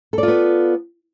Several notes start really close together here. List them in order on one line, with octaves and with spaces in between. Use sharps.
A4 D5 F4 B3